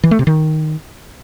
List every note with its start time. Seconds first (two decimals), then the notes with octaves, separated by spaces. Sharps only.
0.04 E3
0.11 A3
0.19 C3
0.27 D#3